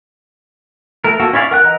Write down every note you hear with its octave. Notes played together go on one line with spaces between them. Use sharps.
A3 A#4
A#3 F#4 A4
C#4 E4 C#5 D5 F5
A#4 F#5 F#6
E3 D#5 A#5